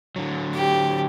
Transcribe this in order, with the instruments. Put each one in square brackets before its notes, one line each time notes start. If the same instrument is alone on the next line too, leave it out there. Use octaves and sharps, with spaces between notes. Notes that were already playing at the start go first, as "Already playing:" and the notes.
[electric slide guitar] D3 F#3
[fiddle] G4